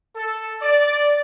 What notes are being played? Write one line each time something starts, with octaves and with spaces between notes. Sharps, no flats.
A4
D5